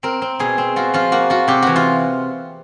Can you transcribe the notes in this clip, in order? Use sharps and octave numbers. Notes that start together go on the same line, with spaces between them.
C4 A#4
C4
B2 G#4
C4
F4 F#4
F3 F4
A#3 F#4
F4 F#4
C3 G4
E3 F#4
F4